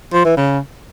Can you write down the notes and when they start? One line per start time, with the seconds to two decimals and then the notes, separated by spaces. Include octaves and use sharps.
0.13 F3
0.25 E3
0.37 C#3